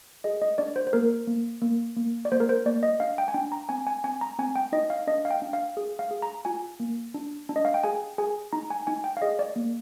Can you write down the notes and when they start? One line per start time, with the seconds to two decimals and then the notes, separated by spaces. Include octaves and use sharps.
0.24 G#4 D#5
0.42 D#5
0.58 D4 D5
0.76 C5
0.87 C5
0.93 A#3 A#4
1.27 A#3
1.62 A#3
1.97 A#3
2.25 D5
2.32 A#3 C5
2.40 A#4
2.49 C5
2.66 A#3 D5
2.83 D#5
3.00 D4 F5
3.18 G5
3.28 G#5
3.34 D4 G5
3.52 A#5
3.69 C4 G#5
3.87 G#5
4.04 C4 G#5
4.21 A#5
4.39 C4 G#5
4.56 G5
4.72 D#4 D#5
4.90 F5
5.07 D4 D#5
5.25 F5
5.31 G5
5.42 D4
5.53 F5
5.77 G#4
5.99 F5
6.11 G#4
6.22 A#5
6.45 F4 G#5
6.80 A#3
7.14 D4
7.49 D4
7.56 D#5
7.65 F5
7.74 G5
7.84 G#4 G#5
8.18 G#4 G#5
8.53 D#4 A#5
8.70 G#5
8.87 D#4 G#5
9.04 G5
9.17 F5
9.22 G#4 D#5
9.39 D5
9.56 A#3